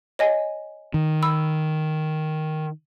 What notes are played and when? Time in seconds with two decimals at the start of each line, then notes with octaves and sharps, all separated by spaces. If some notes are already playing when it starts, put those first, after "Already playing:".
0.19 C#5 D#5 G#5
0.94 D#3
1.23 B5 E6